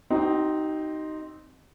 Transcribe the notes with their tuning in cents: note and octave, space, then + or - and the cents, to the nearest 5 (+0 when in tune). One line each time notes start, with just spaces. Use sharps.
C4 +0 D#4 +0 F#4 +45